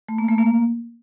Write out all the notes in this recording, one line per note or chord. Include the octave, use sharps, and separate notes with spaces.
A3
A#3
A3
A#3